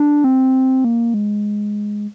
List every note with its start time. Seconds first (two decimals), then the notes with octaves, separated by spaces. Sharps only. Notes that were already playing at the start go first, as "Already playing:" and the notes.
Already playing: D4
0.24 C4
0.85 A#3
1.14 G#3